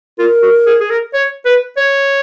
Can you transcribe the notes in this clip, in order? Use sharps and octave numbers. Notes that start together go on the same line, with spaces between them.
F4 A#4
F#4
G#4
G#4
A#4
C#5
B4
C#5